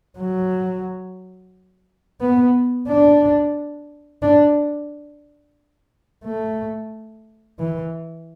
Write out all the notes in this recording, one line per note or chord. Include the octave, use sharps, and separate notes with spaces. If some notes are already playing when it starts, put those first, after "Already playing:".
F#3
B3
D4
D4
A3
E3